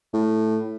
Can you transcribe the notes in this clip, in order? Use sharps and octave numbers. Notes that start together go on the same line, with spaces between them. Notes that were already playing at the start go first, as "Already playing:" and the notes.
A2